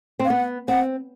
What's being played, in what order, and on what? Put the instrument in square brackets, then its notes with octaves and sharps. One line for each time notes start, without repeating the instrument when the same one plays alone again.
[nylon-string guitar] C4
[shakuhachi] F5
[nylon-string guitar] B3 [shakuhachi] F#5
[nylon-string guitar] C4 [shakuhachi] F#5